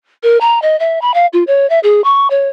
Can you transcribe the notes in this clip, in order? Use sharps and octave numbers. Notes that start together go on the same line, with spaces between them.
A#4
A#5
D#5
E5
B5
F5
F4
C#5
E5
G#4
C#6
C#5